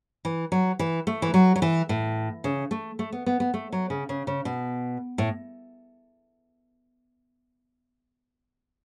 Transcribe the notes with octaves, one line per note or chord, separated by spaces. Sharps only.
E3
F#3
E3
A3
E3
F#3
F#3
E3
A2
C#3
A3
A3
B3
B3
B3
A3
F#3
C#3
C#3
C#3
B2
A2